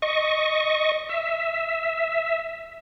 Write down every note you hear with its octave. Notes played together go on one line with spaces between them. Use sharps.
D#5 C#6
E5